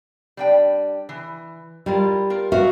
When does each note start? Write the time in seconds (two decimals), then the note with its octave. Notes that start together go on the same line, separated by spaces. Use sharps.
0.37 G3 D4 G5
1.09 E3
1.86 G3 E4 F4 A#4
2.30 F4 A#4
2.52 A#2 F#4 E5 F5